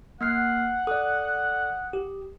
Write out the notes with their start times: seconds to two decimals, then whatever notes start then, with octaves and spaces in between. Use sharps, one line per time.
0.21 A#3 F#5 F6 C7
0.87 A4 D5 D#6
1.93 G4